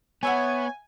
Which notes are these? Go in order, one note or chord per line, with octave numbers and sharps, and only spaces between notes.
B3 B4 C#5 E5 F#5 G#5